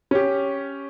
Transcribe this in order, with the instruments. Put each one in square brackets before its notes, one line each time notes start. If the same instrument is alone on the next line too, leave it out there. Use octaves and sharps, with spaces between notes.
[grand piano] C#4 G4